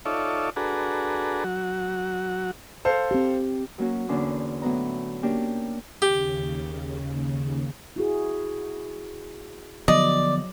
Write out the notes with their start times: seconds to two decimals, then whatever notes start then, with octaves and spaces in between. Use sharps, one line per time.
0.05 D#4 F4 A4 C#5 D5 E5
0.56 D4 F#4 G#4 A4 B4 A#5
1.44 F#3 F#4
2.85 A4 C5 F5
3.11 C4 G4
3.78 F#3 A#3 C#4 F#4
4.09 E2 D3 A#3 C#4 D4 C6
4.62 A2 F#3 B3 A#5
5.23 A#3 C#4 D4 G4 A#4
6.02 D#2 C#3 G4
7.96 E4 F#4 G#4
9.88 D3 F3 F#3 B3 D5 D#5